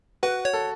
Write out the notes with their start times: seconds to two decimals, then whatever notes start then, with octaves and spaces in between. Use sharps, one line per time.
0.23 F#4 B4
0.45 C#5
0.53 A4